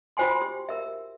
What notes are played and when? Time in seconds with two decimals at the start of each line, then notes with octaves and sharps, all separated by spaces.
0.17 F4 F#4 C5 G5 G#5 C6
0.42 G4
0.69 A#4 E5